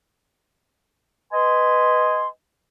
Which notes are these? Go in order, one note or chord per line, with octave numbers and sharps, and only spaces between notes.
B4 D#5 G#5 C6